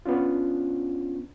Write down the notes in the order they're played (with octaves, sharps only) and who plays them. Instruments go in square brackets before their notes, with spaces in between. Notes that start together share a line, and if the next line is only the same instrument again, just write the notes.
[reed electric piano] B3 C#4 D4 F4